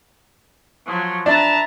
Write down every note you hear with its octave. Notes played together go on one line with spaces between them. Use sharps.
F3 F#3
D4 B4 E5 A5 A#5